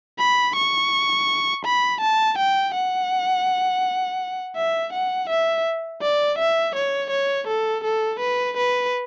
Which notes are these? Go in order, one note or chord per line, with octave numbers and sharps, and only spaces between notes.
B5
C#6
B5
A5
G5
F#5
E5
F#5
E5
D5
E5
C#5
C#5
A4
A4
B4
B4